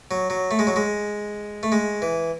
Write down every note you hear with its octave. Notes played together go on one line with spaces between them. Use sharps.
F#3
F#3
A3
G#3
F#3
G#3
A3
G#3
E3